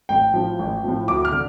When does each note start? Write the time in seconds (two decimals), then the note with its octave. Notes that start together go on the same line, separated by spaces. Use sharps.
0.09 A1 G5
0.34 A2 F3
0.59 A1
0.84 A2 F3
1.08 D2 D6
1.25 F6
1.32 D3